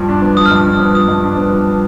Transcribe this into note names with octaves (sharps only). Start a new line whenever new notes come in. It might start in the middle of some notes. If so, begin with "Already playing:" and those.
Already playing: G2 F3
D4
B3
F3 D#6
F6
G2
D#6
D4
B3
F3 D#6
G2
D4
B3
F3